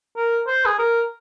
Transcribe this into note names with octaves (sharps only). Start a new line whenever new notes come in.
A#4
C5
G#4
A#4